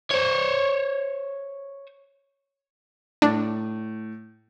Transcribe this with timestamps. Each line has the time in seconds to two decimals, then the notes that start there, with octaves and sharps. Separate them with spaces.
0.11 C5 C#5
3.22 A2 D4